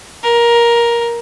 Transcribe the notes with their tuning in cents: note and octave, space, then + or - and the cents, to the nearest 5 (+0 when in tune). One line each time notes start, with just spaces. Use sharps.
A#4 +15